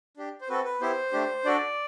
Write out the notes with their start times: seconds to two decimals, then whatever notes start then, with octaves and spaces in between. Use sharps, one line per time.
0.17 D4 G4
0.41 C5
0.49 C4 F#4 A4 B4
0.64 B4
0.81 B3 E4 G4 C5
1.12 A3 D4 G4
1.45 D4 F#4 A4 D5